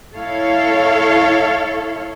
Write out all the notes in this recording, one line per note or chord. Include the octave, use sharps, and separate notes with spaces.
E4 A4 C#5 F5